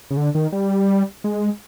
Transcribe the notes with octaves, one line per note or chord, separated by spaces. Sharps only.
C#3
D3
D#3
G3
G#3